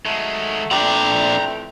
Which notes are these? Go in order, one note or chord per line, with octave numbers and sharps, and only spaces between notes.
D#3 F#3 G#3 A3
F2 A#2 E3 A3 D4 G5 A#5 B5